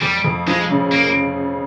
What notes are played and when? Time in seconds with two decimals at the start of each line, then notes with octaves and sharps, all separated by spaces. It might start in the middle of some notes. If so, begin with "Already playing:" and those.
0.01 F2 G3
0.24 F2
0.47 F3 G#3
0.70 C#3
0.92 A#3